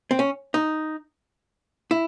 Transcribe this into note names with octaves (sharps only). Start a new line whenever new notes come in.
C4
C#4
D#4
E4